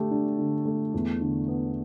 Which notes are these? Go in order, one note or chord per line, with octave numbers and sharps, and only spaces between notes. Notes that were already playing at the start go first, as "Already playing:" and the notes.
Already playing: D3 A3 G4
D4
D3
A3
E2
D3
B3